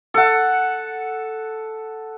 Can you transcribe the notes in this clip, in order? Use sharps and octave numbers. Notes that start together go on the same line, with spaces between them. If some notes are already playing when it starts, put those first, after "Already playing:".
A4 F#5